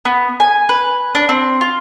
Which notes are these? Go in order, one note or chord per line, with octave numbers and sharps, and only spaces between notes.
B3
G#5
B4
D4
C4
F4